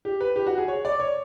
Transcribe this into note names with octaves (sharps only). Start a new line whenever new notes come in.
G4
B4
G4
F#4
G#4
C#5
D5
C#5